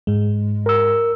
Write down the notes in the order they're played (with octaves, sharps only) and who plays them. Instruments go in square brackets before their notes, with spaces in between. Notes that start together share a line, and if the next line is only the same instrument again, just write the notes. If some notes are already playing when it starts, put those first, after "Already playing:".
[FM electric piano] G#2 G#3
[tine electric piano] A#4 E6